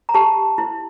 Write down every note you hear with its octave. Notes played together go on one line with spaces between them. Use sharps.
A#5
G4 A5
E4